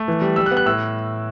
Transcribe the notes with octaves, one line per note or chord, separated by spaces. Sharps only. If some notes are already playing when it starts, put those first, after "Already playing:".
Already playing: A3
E3
G3
G3 E6
F#6
B3
F#6
A2 E6